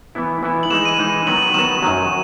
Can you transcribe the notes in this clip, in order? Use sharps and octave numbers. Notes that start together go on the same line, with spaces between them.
E3 B3 E4
E3 B3 E4
F#7
E3 G#3 D#4 E7
D#7
E3 G#3 D#4 E7
E7
D#3 F#3 B3 F#4 F#7
D#3 F#3 B3 F#4 E7
E7
F#2 D#3 F#3